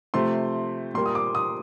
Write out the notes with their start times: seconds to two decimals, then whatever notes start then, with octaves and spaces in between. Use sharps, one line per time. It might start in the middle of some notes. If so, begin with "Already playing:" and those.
0.14 C3 F3 A3 C6
0.94 A#2 G3 A#3 C6
1.06 D#6
1.15 D6
1.35 D#6